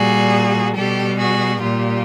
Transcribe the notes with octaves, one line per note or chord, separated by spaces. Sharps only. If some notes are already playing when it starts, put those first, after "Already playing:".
Already playing: A#2 G3 F#4 G#4
B2 G3 G4 A4
F#4 G#4
A#2 G3 F4 G4